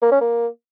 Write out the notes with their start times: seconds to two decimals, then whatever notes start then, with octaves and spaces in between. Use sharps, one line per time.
0.02 A#3
0.12 C#4
0.21 A#3